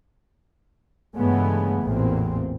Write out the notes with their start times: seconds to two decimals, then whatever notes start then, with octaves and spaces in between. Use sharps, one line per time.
1.17 G2 C#3 E3 G#3 A3 B3
1.82 A1 E2 A#2 C4